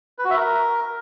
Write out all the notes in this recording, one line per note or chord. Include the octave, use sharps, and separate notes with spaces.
B4
F#4
E5
A#4